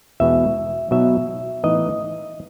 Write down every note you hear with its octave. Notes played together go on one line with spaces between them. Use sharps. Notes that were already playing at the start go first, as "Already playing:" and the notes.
E2 B2 G#3 B3 E5
B2 F#3 B3 D#4 E5
A2 E3 B3 D#4 D#5